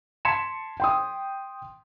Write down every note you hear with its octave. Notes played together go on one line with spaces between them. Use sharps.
A5 C6 G#6 B6 C#7 E7
G5 C6 D#6